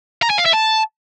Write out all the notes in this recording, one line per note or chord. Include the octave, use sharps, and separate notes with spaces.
A#5
G#5
F5
E5
A5